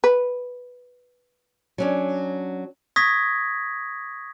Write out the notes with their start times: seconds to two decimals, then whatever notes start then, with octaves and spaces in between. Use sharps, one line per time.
0.04 B4
1.78 F#3 C#4 D4
2.96 C#6 D#6 G#6 A#6 B6